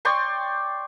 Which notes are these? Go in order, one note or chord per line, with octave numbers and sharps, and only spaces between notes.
D5 G5 C6 C#6